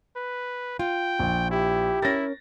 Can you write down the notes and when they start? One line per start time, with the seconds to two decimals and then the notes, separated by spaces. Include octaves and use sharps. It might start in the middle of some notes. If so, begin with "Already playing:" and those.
0.16 B4
0.79 F4 G5
1.19 A#1
1.51 E4 G4
2.02 C#4 E4 A#4 A6 A#6